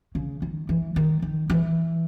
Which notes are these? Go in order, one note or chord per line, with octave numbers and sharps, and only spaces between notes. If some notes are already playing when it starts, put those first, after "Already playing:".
C#3
D#3
E3
D#3
D#3
E3